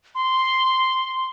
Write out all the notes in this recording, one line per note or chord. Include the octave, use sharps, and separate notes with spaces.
C6